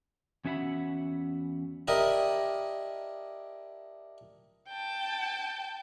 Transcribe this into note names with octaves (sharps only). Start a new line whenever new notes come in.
E2 C#4 F#4 E5 F#5 B5
D4 E4 G4 A#4 D#5
G5 A5